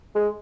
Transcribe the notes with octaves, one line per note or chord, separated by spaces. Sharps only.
G#3